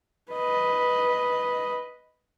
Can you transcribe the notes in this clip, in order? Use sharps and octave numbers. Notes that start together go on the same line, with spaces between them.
B4 D#5